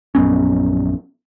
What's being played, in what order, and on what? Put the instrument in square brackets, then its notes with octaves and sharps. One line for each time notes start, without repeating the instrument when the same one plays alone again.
[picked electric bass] A#1 F#2 B3 C#4